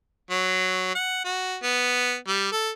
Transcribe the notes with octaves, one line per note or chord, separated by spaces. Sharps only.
F#3
F#5
F#4
B3
G3
A4